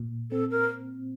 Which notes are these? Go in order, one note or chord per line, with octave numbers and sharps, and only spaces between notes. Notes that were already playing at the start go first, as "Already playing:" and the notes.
Already playing: A#2
C4 A4
A#4